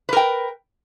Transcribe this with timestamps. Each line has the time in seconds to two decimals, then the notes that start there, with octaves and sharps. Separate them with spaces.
0.09 B4
0.13 A#4
0.17 G5